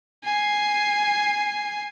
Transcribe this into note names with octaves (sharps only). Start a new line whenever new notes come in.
G#5 C7